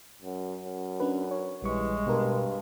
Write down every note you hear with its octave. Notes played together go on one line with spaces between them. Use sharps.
F#2
F#2
C#4 D4 B4
C#5
A#1 E3 G3 G#3 C#6
G2 B2 A#4